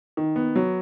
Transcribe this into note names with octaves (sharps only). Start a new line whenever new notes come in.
D#3
B3
F#3